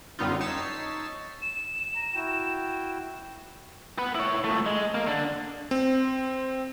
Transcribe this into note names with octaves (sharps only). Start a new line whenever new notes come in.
F#2 D3 G3 B3 D#4 F4
D#4 C#5 A5 E6 B6 C7
E7
A#5
E4 F#4 G5
B4 F#5
E4 C#5
A#2 A3
G#3
A#3
D3 D4
C4